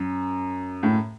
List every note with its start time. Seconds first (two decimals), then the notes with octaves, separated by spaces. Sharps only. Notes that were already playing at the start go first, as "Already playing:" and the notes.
Already playing: F#2
0.83 A2